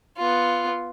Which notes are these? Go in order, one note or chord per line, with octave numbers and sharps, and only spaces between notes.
B3 F4